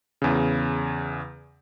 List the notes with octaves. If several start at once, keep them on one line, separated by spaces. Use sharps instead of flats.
E2 C#3